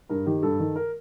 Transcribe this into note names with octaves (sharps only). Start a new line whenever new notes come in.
G2 A#4
D#3 G4
G2 A4
D#3
A#4